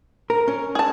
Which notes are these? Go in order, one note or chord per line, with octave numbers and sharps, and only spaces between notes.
A#4
C#4
G#4 A5